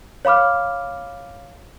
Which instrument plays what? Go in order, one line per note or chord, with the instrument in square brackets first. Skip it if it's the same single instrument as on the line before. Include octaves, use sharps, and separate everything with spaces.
[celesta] C#5 F5 B5 D6 F6